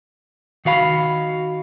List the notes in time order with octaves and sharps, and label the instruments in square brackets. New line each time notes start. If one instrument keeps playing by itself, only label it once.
[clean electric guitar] D#3 F#4 F5 B5